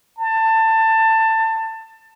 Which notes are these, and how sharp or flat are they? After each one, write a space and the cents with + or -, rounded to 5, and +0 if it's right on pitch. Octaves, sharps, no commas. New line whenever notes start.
A5 +20